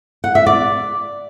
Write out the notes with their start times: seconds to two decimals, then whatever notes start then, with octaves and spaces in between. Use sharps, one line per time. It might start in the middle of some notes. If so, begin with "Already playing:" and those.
0.24 F#5
0.35 E5
0.47 D5